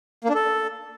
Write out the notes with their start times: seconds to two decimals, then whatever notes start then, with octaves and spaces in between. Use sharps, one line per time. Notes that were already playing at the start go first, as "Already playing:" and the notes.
0.24 A#3
0.30 D4
0.35 A4